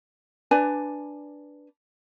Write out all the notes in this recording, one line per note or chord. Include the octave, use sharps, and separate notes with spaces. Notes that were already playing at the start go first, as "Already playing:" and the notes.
D4 B4 D5 G#5